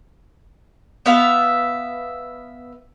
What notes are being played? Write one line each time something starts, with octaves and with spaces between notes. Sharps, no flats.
B3 E5 F5